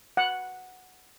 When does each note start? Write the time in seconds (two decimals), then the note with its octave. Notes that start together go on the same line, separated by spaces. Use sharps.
0.17 F#5